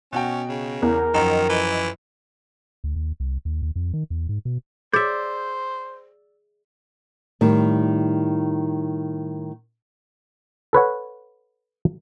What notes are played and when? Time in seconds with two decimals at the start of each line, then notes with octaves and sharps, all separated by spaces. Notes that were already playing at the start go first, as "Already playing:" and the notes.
0.13 B2 C#4 F#4 G5
0.49 C#3
0.82 E2 A#4
1.14 F#2 D#3 F3 D#5 A#5
1.49 E3
2.84 D2
2.96 D#2
3.20 C2
3.45 D#2
3.62 D#2
3.76 F2
3.93 D#3
4.10 E2
4.29 G#2
4.45 B2
4.94 G#4 C5 D5 E5 G6
7.41 A2 D#3 G3
10.73 A4 B4 C#5 F#5